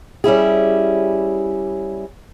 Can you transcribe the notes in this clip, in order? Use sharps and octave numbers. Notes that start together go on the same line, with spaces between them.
G3 C#4 E4 G#4